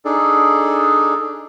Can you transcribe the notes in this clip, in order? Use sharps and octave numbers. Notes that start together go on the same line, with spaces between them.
D4 D#4 G#4 A4 D5